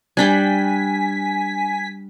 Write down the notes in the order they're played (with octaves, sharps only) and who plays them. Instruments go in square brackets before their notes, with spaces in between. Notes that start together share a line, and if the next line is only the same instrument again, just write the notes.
[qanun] G3 D4 G5 [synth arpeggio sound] G#5 B6